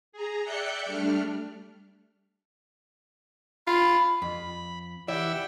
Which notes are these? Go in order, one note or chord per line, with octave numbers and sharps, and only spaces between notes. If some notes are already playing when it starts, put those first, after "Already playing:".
G#4 A#5
D5 E5 G5 F#6 G6 C#7
G3 A3 D4 F6
F4 B5
F2 B5
E3 E4 G4 D5 E5 F#5 G5